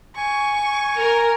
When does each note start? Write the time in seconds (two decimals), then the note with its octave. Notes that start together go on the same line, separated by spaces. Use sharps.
0.17 G#5 C#6
0.96 A#4